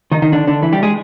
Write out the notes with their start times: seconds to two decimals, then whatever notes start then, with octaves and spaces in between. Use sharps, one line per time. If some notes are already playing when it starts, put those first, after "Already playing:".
0.11 D#3 D#4
0.22 D#3 D#4
0.32 D3 D4
0.47 D3 D4
0.63 E3 E4
0.73 G3 G4
0.83 G#3 G#4